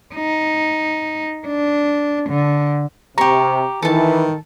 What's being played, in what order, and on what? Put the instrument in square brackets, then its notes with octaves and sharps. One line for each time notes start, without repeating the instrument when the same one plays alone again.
[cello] D#4
D4
D3
[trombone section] C3 [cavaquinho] G4 C#6 [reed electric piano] A#5
[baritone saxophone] D#3 [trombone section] E3 [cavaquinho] A4 A5